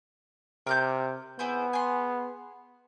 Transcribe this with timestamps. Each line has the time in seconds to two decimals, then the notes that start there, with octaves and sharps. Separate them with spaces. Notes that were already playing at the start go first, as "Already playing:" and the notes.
0.67 C3 A#4 D6 G6
1.39 B3 E4 G#4 C5
1.73 G#4 C6